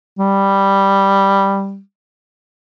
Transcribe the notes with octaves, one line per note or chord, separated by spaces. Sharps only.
G3